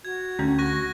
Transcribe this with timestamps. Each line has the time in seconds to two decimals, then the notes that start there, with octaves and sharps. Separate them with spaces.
0.05 F#4 G#6
0.39 D2 A3 C#4
0.59 F#4 C#6 F#6 A#6